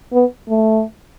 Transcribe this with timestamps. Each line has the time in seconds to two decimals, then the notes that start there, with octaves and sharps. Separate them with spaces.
0.12 B3
0.49 A3